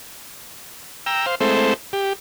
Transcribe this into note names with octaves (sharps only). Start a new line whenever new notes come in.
G5 A#5 E6
C5 F5
G#3 A3 C4 E4 A4 C5
G4